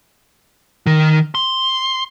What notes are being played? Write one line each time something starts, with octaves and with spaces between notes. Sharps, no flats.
D#3
C6